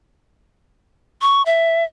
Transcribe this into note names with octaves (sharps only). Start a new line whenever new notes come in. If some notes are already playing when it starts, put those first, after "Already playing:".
C#6
E5